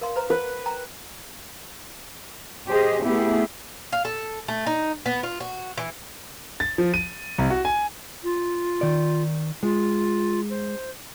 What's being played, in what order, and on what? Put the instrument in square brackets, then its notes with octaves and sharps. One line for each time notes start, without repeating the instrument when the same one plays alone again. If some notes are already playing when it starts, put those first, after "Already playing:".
[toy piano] A#4 F5 C6
B4 C5 A#5
[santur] B4 [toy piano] C5
[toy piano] G5 A#5
[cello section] G4 G#4 C5 D#5
A3 B3 E4 G4 G#4
[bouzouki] F5
A4
A3
D#4
B3
F4
F#4
E3
[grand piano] A6
F3
D#7
C2
F#4
G#5
[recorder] F4
[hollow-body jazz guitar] D#3 D5
[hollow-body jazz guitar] G#3 [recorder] F4
[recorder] C5